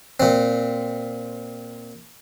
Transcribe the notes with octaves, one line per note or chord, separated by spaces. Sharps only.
A#2 C4